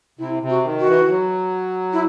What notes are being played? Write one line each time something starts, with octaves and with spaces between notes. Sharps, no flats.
C3 E4
C3
F#4
D#3
F#4
E3
E3
F#3
E4